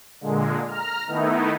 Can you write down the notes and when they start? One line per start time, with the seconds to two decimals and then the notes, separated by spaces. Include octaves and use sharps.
0.21 A#2 D3 G#3
0.67 A#5 F6
1.07 D#3 A3 B3 D#4 E4